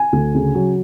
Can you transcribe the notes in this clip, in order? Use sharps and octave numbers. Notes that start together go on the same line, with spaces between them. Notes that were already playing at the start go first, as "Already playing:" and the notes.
Already playing: G#5
D2
C#3
F#3